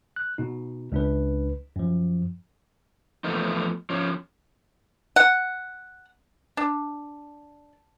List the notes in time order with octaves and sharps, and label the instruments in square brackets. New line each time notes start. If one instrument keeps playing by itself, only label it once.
[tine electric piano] F#6
B2 D#4
C#2 D4 B4
F#2 F3
[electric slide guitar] E2 F3 A3 B3 D#4
F3 C#4
[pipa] F#5
D4